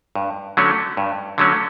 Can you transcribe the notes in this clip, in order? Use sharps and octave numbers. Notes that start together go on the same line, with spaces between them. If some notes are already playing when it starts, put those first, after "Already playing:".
G2
D3 F#3 A3 C#4
G2
D3 F#3 A3 C#4